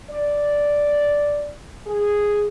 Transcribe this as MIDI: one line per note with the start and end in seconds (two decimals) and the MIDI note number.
0.10 1.51 74
1.87 2.46 68